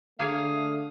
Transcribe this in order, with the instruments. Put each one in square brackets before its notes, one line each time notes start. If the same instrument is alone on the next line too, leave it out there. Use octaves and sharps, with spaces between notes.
[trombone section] D3 A3 [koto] A#3 G#4 C#5 [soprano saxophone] F5 [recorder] D#6